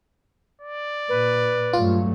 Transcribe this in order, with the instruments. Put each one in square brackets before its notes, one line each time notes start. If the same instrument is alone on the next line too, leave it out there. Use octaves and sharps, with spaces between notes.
[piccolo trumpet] D5
[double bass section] A#2 [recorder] B4
[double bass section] G2 F#3 A3 [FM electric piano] F4